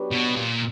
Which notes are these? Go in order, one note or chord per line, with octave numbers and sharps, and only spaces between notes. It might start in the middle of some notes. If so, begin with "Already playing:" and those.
Already playing: F#3 B3 D4 G4 B4
B2
A#2